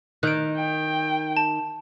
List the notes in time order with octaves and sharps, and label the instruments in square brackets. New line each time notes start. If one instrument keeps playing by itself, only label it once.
[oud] D#3 [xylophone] F#6 G6 D7
[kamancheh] G5
[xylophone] A5